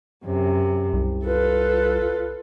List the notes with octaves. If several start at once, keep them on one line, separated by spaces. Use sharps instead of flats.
F#2 C3
C2
F4 A4 B4